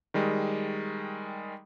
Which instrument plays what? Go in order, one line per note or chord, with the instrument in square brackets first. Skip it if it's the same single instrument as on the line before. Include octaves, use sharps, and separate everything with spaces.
[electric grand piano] D#3 G3 G#3